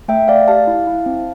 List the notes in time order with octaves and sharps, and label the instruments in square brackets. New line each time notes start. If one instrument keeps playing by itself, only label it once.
[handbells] A3 E5 G5
A3 D5 F5
G4 F5 A5
E4
E4
C4